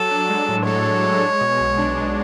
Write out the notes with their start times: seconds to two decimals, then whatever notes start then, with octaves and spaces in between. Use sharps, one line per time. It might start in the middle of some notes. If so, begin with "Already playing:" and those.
Already playing: F#3 A4
0.11 D4
0.29 G#3
0.48 A2
0.66 A4 C#5
0.86 D4
1.03 G#3
1.22 G#3
1.41 B2
1.60 B1
1.78 D4
1.97 G#3